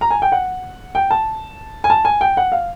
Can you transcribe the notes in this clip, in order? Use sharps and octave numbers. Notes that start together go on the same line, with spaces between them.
A#5
G#5
G5
F#5
G5
A5
G#5
A5
G#5
G5
F#5
F5